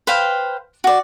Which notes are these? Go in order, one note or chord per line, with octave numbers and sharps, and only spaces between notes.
B4 C5 F5 G5
F#4 D5